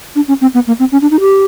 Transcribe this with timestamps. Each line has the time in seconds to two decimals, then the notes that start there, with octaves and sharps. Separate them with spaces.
0.15 D4
0.28 C#4
0.41 C4
0.54 B3
0.67 A#3
0.79 C4
0.92 C#4
1.02 D4
1.11 D#4
1.20 G4